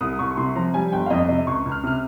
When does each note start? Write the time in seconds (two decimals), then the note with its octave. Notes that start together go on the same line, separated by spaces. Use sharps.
0.01 C2 D#6
0.19 C2 C#6
0.31 C#6
0.37 C3 C6
0.56 F3 A#5
0.74 G3 G#5
0.92 G1 G5
1.06 F5
1.10 F2 D#5
1.29 C3 D#5
1.47 C#2 C#6
1.65 C#2
1.72 F6
1.84 C3 F6